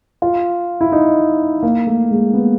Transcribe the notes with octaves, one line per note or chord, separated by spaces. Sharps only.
F4
E4
D#4
A#3
A3
G#3
B3